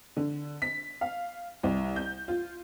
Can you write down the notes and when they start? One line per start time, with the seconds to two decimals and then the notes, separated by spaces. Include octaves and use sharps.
0.17 D3
0.62 B6
1.01 F5
1.63 C2
1.96 G6
2.28 F4